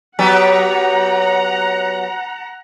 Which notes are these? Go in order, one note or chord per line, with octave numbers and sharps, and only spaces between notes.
F#3 B3 G4 F#5 A#5